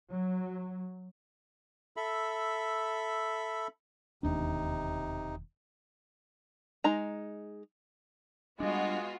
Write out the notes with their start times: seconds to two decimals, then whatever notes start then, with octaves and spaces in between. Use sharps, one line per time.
0.11 F#3
1.97 A4 E5 B5
4.23 E1 D#2 C3 D4 D#4
6.84 G#3 D#4 A#5
8.60 G3 G#3 B3 D4 F4 F#4 D#5